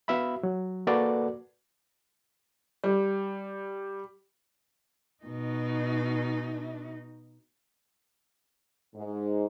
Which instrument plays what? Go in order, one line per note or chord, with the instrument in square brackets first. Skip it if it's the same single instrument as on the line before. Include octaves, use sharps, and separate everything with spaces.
[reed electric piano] B3 F#4 E5 F5 B5
F#3
A#3 F#4 A4 B4 D5 F#5
[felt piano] G3
[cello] B2 D#4
[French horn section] G#2